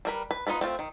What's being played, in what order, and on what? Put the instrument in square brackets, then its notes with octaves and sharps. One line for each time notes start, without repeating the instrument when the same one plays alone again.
[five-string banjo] G3 A#4 B4
B4
B3 D#4 F4 A4 B4
A3 C4 F4
D#3